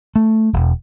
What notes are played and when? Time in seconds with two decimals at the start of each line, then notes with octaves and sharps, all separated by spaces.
0.16 A3
0.53 E1